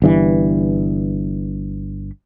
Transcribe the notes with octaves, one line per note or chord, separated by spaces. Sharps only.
G1 G2 E3